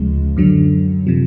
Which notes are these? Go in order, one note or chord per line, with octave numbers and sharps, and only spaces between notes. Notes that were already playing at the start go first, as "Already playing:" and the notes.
Already playing: D2 C#3 F3 G#3
F#2 D3 F#3
C3 F3